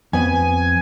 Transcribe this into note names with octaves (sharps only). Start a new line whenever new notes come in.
F2 B3 G#5